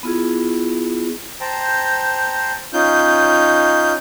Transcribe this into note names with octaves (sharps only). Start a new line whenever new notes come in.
B3 E4 F4 G#4
C5 G5 A5 A#5
C#4 D#4 F4 G6